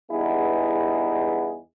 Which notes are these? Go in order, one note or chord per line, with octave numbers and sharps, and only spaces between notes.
E2 G2 B3 D#4 E4 G#4